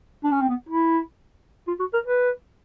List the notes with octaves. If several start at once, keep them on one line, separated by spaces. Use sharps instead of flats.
D4
C#4
C4
B3
E4
F4
F#4
A#4
B4